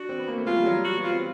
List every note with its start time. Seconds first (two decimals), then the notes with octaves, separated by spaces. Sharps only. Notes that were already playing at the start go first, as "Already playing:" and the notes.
Already playing: D4 F#4
0.09 C4
0.18 B3
0.28 A#3
0.38 A3
0.47 G#3 F4
0.56 G3
0.66 F#3
0.84 F#4
0.98 B3
1.04 F4
1.10 C4